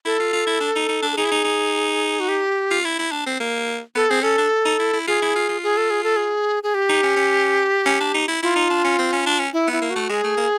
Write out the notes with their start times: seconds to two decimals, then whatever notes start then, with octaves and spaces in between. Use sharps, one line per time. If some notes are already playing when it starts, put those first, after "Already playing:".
0.05 E4 A4
0.20 F4
0.33 F4
0.47 E4
0.60 D4
0.75 D#4
0.89 D#4
1.03 D4
1.12 A4
1.17 D#4 G#4
1.25 E4
1.31 D#4
1.44 D#4
2.20 F#4
2.28 G4
2.71 F4
2.85 E4
2.99 E4
3.11 D4
3.26 C4
3.40 A#3
3.95 B3 A4
4.10 C4 G#4
4.22 C#4 A4
4.38 D4
4.65 D#4
4.79 E4
4.93 E4
5.07 F4 G#4
5.22 E4
5.35 F4
5.49 F4
5.63 G#4
5.77 A4
5.90 G#4
6.04 A4
6.16 G#4
6.63 G#4
6.74 G4
6.89 D#4
7.03 C#4
7.16 C#4
7.86 C#4
8.00 D4
8.14 D#4
8.28 E4
8.43 E4 F4
8.56 D#4
8.70 D4
8.85 C#4
8.98 C4
9.12 C#4
9.26 D4
9.39 C#4
9.53 E4
9.67 B3
9.72 E4
9.82 A#3
9.90 F#4
9.96 A3
10.09 G#3 G#4
10.24 A3
10.37 A#3